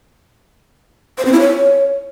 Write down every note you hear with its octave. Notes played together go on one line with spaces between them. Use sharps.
C5
C4
E4
C#5